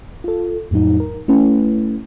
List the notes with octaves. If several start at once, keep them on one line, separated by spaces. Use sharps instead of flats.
F4 A4
F2 A2 F#3 D#4
A#4
A3 C#4 E4 B4